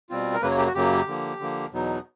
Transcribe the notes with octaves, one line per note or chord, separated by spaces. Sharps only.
B2 G3 C4 F4
A#4
F#2 C#3 F#3 A#3 B4
C#5
G4
F#4
F#2 C#3 F#3 A#3 G4
D3 F3 A#3
D3 F3 A#3
E2 B2 F#3 B3 D#4